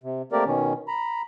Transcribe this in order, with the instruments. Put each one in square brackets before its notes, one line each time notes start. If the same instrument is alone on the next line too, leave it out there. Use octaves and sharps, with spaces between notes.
[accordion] C3
A3 A#3 C4 G4 A#4 D5
B2 D#3 C#4
A#5 B5